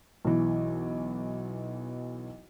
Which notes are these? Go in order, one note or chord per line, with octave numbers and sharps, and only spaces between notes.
B1 E3